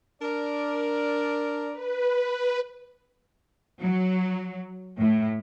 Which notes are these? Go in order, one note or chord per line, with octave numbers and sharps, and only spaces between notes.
D4 A#4 D5
B4
F#3
A2